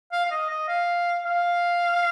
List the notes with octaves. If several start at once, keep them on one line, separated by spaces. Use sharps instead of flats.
F5
F5
D#5
D#5
F5
F5